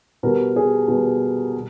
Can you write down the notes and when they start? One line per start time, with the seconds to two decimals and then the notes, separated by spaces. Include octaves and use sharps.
0.23 B2 G3 A#4
0.56 G#4
0.88 B2 G3
1.54 G3